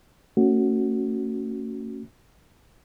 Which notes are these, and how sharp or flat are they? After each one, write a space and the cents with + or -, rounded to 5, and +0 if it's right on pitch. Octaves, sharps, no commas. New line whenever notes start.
A3 +45 C#4 +0 F#4 +0